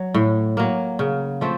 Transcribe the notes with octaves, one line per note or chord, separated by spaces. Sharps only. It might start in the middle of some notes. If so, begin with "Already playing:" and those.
Already playing: F#3
A2
F#3 A#3
C#3
F3 A3 C4